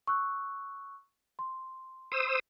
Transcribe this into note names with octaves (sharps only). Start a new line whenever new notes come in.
C#6 E6 F#6
C6
C5 D#6 E6